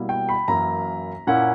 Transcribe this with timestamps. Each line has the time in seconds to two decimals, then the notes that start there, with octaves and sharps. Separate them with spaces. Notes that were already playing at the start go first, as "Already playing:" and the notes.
Already playing: B2 G3 A#3 E4
0.09 G5
0.29 B5
0.48 F#2 E3 A#3 E4 A#5
1.27 A#2 A#3 C#4 E4 F#5